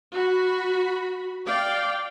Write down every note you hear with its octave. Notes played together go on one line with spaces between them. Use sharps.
F#4 B5
D5 F5 G5